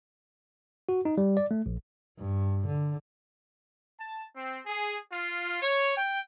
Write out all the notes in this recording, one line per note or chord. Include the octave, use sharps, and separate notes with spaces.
F#4
D#4
G3
D5
A3
A#1
G2
D3
A5
C4
G#4
F4
C#5
G5